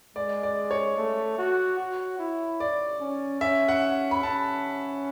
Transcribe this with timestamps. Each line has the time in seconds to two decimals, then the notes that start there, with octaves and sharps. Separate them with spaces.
0.16 G#3 D5
0.43 D5
0.71 C#5
0.98 A3
1.38 F#4
1.79 F#4
2.19 E4
2.60 D5
3.01 C#4
3.41 C#4 E5
3.68 F#5
4.11 B5
4.23 C#4 A5